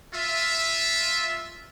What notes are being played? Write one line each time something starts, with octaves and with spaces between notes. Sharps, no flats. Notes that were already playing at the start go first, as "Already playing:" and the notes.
F4 E5